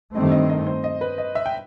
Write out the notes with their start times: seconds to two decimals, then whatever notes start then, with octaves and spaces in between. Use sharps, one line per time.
0.14 G2 D#3 A3 C4 D#5
0.31 D#5
0.50 D#5
0.67 C5
0.84 D#5
1.01 B4
1.18 D#5
1.35 E5
1.46 G5